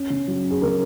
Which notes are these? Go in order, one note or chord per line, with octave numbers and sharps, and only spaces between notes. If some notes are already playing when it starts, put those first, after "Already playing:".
Already playing: C#4
C#3
F#3
C#4
G#4
C#3 A#4